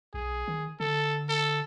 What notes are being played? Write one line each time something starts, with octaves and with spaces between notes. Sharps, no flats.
B1 G#4
D#3
D3 A4
A4